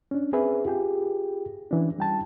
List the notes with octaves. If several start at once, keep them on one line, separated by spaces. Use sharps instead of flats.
C#4 D4
C4 G#4 B4 E5
F4 G4 G#4 G5
E3 C#4 D4
G3 G5 A5